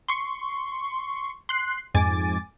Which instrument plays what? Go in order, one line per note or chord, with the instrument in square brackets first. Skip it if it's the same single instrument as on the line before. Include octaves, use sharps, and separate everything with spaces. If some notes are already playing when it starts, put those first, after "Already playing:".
[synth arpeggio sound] C6 C#6
C6 F#6 C7
F2 G#2 G#5 D6 A6